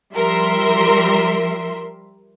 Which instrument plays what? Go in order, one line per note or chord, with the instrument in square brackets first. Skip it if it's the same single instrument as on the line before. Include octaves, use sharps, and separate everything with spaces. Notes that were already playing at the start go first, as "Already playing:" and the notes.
[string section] F3 G3 A#4 E5 C6